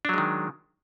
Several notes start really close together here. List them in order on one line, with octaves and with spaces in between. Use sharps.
D4 F#3 G#3 D#3